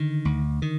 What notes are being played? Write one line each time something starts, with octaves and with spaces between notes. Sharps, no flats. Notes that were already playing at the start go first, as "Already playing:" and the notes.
Already playing: D3 D#3
D2
D#3